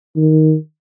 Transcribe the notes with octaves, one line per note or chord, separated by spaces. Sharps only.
D#3